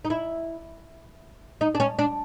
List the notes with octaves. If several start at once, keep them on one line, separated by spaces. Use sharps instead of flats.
D#4
E4
D#4
D4
C#4
D4